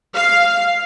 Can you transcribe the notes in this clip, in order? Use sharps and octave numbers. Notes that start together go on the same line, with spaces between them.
F5